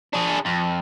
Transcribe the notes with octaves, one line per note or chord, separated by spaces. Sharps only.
D4 G#4
F2